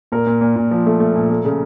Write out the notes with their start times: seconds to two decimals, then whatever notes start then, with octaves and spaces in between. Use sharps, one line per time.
0.12 A#2 A#4
0.27 A#2
0.41 A#2
0.56 A#2
0.71 F3
0.86 A3
1.00 A3
1.15 A#2
1.30 A3
1.45 C#3